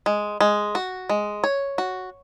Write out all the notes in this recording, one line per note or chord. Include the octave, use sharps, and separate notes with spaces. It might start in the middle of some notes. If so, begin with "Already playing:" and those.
G#3
G#3
F#4
G#3
C#5
F#4